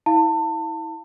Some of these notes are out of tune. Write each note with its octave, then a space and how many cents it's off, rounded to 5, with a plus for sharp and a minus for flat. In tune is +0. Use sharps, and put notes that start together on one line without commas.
E4 -25 F5 +0 A5 +30